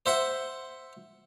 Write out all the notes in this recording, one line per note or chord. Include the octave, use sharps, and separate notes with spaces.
C5 E5 F#5